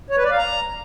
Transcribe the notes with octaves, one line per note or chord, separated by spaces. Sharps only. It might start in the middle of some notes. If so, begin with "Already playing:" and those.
C#5
B4
D5
F5
A#5